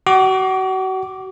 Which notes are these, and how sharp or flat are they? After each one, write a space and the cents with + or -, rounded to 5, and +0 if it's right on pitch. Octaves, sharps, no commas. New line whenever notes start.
F#4 +35 D6 +0